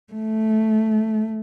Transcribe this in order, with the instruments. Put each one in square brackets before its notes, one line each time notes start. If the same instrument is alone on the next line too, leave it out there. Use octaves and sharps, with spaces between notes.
[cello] A3